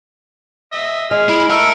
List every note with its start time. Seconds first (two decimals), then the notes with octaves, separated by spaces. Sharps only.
0.72 D#5 E5
1.11 G#3 G#4 F6
1.29 E4 B5
1.50 A#4 E5 A5 E6